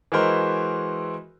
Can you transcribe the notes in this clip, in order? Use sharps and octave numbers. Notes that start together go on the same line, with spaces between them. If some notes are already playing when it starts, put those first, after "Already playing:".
E3 G#3 E4 F#4 A#4 C5